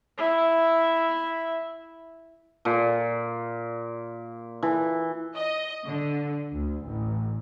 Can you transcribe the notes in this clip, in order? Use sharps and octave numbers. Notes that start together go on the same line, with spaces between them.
E4 E5
A#2
E3
D#5
D3
D2
A1